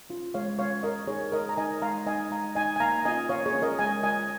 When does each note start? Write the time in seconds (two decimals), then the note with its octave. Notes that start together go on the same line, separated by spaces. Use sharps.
0.10 C#4 F4
0.34 G#3 C#5 F5
0.59 C#4 F4 C#5 F5
0.83 G#3 A#4 D#5
1.08 D#4 G#4 C#5
1.32 G#3 A#4 D#5
1.49 A#5
1.57 D#4 D#5 G#5
1.82 G#3 F5 A#5
2.06 D#4 D#5 G#5
2.31 G#3 F5 A#5
2.55 D#4 D#5 G#5
2.76 G#5
2.80 A#3 F5 A#5
2.96 A#5
3.05 C#4 F4 D#5 G#5
3.29 A#3 C#5 F5
3.46 G#4 C#5
3.54 C#4 F4
3.62 A#4 D#5
3.79 G#3 D#5 G#5
4.03 F4 D#5 G#5